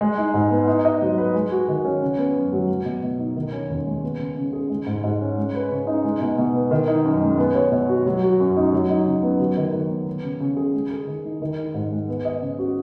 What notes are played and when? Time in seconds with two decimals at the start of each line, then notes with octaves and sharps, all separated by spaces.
0.01 G#3
0.18 D#4
0.34 G#2
0.51 B3
0.68 D#4
0.85 D#5
1.01 F#3
1.18 B4
1.34 G#3
1.52 F#4
1.68 D#3
1.85 C#4
2.02 C#3
2.18 B3
2.35 F#2
2.52 F#3
2.68 F#3
2.85 B2
3.03 B2
3.19 D#4
3.36 D#3
3.52 C#4
3.70 D#2
3.87 G#3
4.03 B3
4.20 C#3
4.37 C#3
4.53 G#4
4.70 G#3
4.86 G#2
5.04 G#2
5.21 C#4
5.37 G#3
5.54 B4
5.71 C#3
5.87 D#4
6.04 G#3
6.21 B2
6.38 B2
6.55 B3
6.71 D#3
6.88 D#4
7.05 F#2
7.22 G#3
7.38 B3
7.55 C#5
7.72 B2
7.89 F#4
8.06 F#3
8.23 F#4
8.40 F#2
8.57 D#4
8.73 F#3
8.90 D#4
9.06 C#3
9.23 B3
9.40 F#3
9.57 D#3
9.73 D#3
9.90 B3
10.07 B3
10.24 C#3
10.40 C#3
10.57 G#4
10.74 G#3
10.91 G#4
11.07 D#3
11.25 D#4
11.42 D#3
11.58 D#4
11.74 G#2
11.91 G#3
12.09 B3
12.25 D#5
12.41 C#3
12.59 F#4